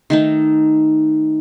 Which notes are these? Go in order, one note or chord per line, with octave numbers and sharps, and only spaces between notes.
D#3 A3 D#4